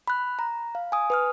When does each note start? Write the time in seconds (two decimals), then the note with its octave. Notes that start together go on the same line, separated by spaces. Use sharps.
0.08 B5 F#6
0.39 A#5
0.75 F5
0.92 G#5 D#6
1.10 B4 D#6 F6